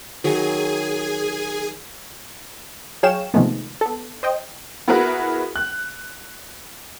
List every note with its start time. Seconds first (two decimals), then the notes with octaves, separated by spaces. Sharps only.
0.24 D#3 F#3 G#4 G#5
3.03 F#3 G#4 C#5 F5 G5 E7
3.34 C3 D#3 F3 G#3 A3 B3
3.81 B3 A4
4.23 C5 D#5 G5
4.88 B3 E4 F#4 G#4 A#4 B4
5.56 F#6